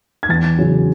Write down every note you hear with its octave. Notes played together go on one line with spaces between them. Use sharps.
G#6
E2 A6
C#3 F#3 C#4